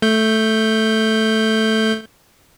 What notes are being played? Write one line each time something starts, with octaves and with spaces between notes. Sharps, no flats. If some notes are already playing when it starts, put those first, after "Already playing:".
A3 G6